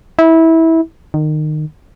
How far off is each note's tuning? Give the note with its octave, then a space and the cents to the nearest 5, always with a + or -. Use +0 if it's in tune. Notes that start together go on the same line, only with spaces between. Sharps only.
E4 -20
D#3 -25